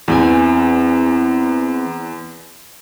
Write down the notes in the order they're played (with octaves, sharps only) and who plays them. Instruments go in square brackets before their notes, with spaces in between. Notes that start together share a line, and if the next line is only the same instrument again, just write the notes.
[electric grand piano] E2 [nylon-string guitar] E3 C4 G#5